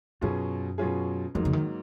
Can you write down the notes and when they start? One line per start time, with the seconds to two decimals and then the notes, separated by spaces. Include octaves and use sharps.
0.21 F#2 B2 F#3 C#4 F4 G#4
0.78 B2 F#3 C#4 F4 G#4
1.35 F2 G#2 F#3 A#3 D#4
1.45 C#3
1.53 D#3